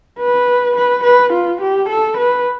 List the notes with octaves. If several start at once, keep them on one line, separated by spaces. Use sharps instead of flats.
B4
B4
B4
F4
G4
A4
B4